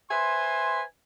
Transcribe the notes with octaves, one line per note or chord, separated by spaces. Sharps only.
B4 C5 E5 G#5 C6